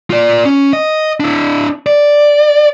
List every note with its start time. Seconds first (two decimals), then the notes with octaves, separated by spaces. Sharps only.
0.10 F4 D5
0.45 C#4
0.73 D#5
1.20 D4 E4
1.86 D5